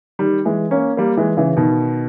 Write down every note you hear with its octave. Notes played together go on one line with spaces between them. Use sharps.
D#3 G3
E3 G#3
A#3 C#4
G3 A#3
E3 G#3
C#3 E3
B2 D#3